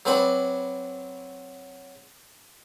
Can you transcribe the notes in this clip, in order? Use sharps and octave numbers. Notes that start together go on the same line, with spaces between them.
F#3 C4 B4 D5 B5